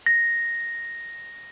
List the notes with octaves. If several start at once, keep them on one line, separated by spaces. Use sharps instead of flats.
A#6